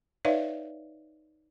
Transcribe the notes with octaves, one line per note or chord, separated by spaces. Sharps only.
D#4 B4 C#5 D5 E5 F5